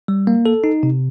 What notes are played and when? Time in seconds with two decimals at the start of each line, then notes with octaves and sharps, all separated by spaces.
0.08 G3
0.27 A#3
0.46 A4
0.64 D#4
0.83 C3